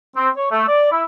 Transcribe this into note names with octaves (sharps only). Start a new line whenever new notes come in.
C4
C#5
A3
D5
E4